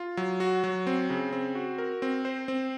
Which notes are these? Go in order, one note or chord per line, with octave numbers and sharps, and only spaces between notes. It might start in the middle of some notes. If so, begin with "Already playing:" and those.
Already playing: F4
F#3
F#4
F#3
C4
C#3
C4
F#4
A#4
C4
C5
C4